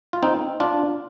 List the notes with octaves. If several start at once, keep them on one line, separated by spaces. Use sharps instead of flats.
F4
C4 D#4
D4 F4